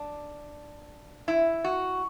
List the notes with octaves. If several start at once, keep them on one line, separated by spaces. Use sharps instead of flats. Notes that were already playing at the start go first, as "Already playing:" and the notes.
Already playing: D4
E4
F#4